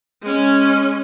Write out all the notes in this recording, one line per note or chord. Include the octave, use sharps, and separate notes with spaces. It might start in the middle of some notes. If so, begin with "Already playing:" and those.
G#3 C#4